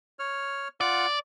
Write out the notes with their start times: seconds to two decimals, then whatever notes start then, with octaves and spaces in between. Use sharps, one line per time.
0.19 C#5 F6
0.81 F4 D5 F#5